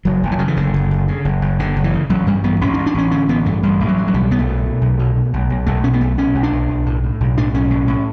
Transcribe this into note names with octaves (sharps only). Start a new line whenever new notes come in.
F#1 F#3
F#1
E3
C#3 F#3
E3
F#1 D3
F#1
F#1
C#3
F#1
F#1
F#1 D3
F#1
E3
C#3
A1 F#3
G2 G3
A1 B3
A1 C#4
D4
G2
D4
A1 C#4
D3 C#4
A1 B3
G2 A3
A1 G3
A1
F#3
G2
F#3
B1 G3
B1 B3
A3
B2
B2
B1
B2
B2
B1
B1
B1 A3
B2 C#4
B3
B1 A3
B1 C#4
B1
D4
B1
B1
A2
A2
B1
A2 D4
B1 C#4
A2
A2